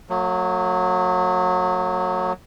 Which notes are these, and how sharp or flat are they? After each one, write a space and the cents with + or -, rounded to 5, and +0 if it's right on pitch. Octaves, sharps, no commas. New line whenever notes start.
F#3 -20 A3 +40